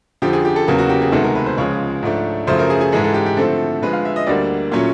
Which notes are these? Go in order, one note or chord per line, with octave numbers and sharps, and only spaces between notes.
F2 D3 F3 G4
G#4
G4
A4
E2 C#3 F#3 A#3
F#4
G4
G#4
D2 C3 D#3 G#3 B3 A4
A#4
B4
C5
C#2 C#3 F3 G#3 C#5
G#2 F3 A3 D4
F#2 C#3 F3 A3 C5
A#4
G#4
G#4
G#2 E3 G#3 A4
A4
G4
G4
D3 F3 A3 C4 E4 A4
D3 F3 G#3 B4
F5
E5
D#5
D2 D3 G3 A#3 D5
A#2 F#3 A3 C#4